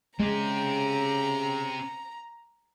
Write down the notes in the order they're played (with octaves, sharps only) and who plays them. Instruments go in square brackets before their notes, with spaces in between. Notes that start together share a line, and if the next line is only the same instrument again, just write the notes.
[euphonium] C#3 [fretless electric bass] G#3 [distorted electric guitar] C4 G4 [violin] A#5